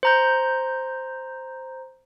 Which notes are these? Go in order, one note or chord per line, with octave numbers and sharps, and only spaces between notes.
C5 A#5 G6